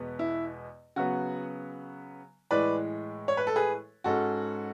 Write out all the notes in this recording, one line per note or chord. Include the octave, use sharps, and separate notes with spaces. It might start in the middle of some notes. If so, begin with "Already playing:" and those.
Already playing: E2 B2 G#3 B3
E4
C#3 F#3 B3 F#4
A2 E3 G#3 B4 D5
C#5
B4
A4
G#4 B4
G#2 G#3 C#4 F#4 A4